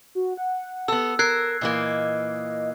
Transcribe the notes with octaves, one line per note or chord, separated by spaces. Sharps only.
F#4
F#5
B3 A4 E6
A#4 E6 F#6 G#6 C7
A#2 E3 A#3 D#5